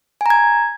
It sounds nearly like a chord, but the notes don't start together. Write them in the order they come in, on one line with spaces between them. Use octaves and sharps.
G#5 A#5 G#6